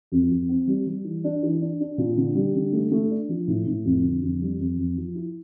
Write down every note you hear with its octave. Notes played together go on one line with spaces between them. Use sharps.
F2
F2
C4
G3
G3
E3
D4
E3
D4
D4
A#2
D3
G3
D3
A3
A3
D4
F3
A2
A2
F2
D3
F2
G3
F2
F2
F3
E4